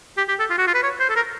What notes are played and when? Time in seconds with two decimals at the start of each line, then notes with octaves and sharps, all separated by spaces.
0.17 G4
0.28 G4
0.39 A4
0.50 F4
0.58 F#4
0.67 F4
0.74 B4
0.83 C#5
1.00 C5
1.09 A4
1.16 A#4